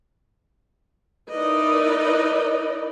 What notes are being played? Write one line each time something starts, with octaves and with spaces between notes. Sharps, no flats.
D#4 E4 A#4 B4 D5 D#5